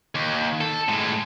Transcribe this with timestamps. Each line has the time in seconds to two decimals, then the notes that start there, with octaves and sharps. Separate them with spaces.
0.15 D#2
0.61 A4
0.88 A2 G#3